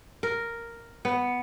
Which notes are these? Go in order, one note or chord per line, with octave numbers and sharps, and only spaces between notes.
A#4
B3